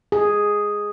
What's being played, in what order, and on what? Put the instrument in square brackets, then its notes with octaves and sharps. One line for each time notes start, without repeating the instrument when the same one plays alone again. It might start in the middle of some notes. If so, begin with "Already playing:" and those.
[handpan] G#4